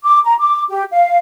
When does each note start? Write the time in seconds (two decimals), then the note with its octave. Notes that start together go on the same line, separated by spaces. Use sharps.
0.03 D6
0.24 A#5
0.39 D6
0.69 G4
0.92 F5